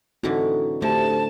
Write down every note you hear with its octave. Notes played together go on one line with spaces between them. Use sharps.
A2 D3 E3 C4 D#4 F#4
D3 A3 G4 C5 E5 A5